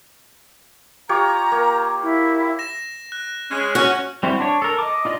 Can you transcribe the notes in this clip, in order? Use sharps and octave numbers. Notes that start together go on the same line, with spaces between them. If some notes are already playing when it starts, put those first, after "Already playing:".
F4 G4 C#5 A#5
A#3
E4
A#6 E7
F#6
G#3 C#4
C#4 F#4
G3 C4 E4 F#4
D4 C#5
A4 A#4
D#5 D6
D#4 F4 D5 D#5